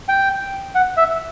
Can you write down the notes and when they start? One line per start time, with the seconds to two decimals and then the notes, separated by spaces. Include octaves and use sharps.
0.09 G5
0.75 F#5
0.97 E5